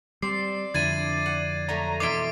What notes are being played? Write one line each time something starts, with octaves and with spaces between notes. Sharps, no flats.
G3 C4 D5 C7
F2 D3 D4 E4 G#6 A6 D#7
F#5
F#3 A3 A#5
B2 E3 E5 C6 D6 D7